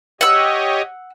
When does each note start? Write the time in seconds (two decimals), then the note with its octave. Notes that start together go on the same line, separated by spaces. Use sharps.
0.21 G4 C#5 D#5 F#5 E6